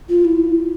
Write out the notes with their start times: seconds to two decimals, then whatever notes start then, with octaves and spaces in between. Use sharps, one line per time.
0.09 F4
0.25 E4